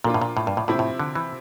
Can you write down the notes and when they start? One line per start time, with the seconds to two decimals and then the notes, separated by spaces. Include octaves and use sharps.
0.04 A#2 F3 A#3 D4 F4
0.14 A2
0.21 A#2
0.37 A2
0.47 G2
0.57 A2
0.68 A2 C3 F3 C4 E4
0.79 A2
1.00 D3
1.15 E3